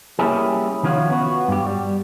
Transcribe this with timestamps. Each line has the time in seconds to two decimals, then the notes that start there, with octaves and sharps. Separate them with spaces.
0.19 G3 A#3 C#4 E4 G4 G#4
0.83 D#3 F3 C#4 F4 F#4
1.10 B3 F#4
1.48 G2 G4
1.66 G3